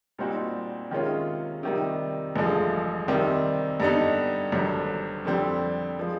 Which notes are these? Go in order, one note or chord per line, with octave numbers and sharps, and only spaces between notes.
A#2 G3 C4 D#4 F#4
C3 D#3 G#3 C#4 F4
C3 D#3 G3
A1 G2 D3 F3 G#3
C3 D#3 G3 C4
G2 D3 G3 B3 D#4
G#1 G2 D3 F#3
F2 D3 G3 C4
F3 G#3